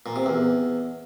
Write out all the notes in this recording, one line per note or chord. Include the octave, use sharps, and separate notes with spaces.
A#2
C3
E2